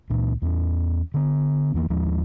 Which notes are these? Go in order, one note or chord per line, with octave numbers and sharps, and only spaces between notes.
C#2 A#2
E2 C4 C#4
D3 B3
E2 E3 A#3
D#2 F3 G#3